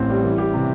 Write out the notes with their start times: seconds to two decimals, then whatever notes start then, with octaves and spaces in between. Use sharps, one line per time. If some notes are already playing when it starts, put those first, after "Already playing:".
Already playing: A1 A2 C4
0.09 G3
0.24 E3
0.38 G4
0.54 C3